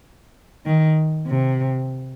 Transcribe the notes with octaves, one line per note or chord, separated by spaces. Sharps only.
D#3
C3